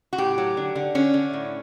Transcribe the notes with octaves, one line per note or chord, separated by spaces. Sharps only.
F#4
A2 G4
F#3
D3
D3
D3 C#4
D3
A2